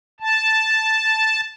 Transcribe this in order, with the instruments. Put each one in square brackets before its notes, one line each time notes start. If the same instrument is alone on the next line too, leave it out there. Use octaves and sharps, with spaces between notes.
[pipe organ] A5